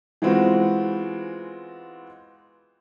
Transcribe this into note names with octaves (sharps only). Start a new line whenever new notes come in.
E3 G#3 B3 C4 F4 F#4